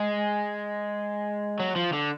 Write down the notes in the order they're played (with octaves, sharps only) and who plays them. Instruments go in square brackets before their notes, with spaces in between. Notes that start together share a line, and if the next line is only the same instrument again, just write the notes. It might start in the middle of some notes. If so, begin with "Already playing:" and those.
Already playing: [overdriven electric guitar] G#3
F#3
F3
D3